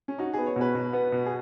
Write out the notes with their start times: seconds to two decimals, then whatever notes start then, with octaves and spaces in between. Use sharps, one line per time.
0.08 C#4
0.18 D#4 F#4
0.33 B3 G#4
0.46 C#5
0.56 B2 B4
0.75 B2
0.93 B3
1.12 B2
1.26 G#4